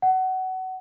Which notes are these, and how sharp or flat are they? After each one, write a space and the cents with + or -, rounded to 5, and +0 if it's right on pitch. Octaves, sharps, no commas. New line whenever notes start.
F#5 +25